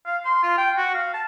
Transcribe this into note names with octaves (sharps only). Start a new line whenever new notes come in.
F5
C6
F4
G5
F#4
F5
A5